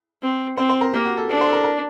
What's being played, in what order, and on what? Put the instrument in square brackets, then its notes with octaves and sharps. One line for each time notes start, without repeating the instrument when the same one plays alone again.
[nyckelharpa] C4
[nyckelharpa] C4 [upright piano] C5
[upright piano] C5
A#4
[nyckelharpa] A#3 [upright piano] G4
[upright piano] F#4
A4
[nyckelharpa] D4 [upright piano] A4
[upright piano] C5
A4
A#4
A#4